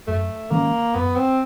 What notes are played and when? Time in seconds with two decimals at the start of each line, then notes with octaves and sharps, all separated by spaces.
0.07 F#2 A3
0.51 D#3 G#3 A#3 C#4
0.95 F#2 B3
1.16 C4